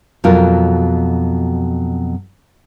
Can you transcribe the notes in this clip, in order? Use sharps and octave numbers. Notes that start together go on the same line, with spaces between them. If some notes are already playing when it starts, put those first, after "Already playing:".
F2 B2 F#3 F4 A#4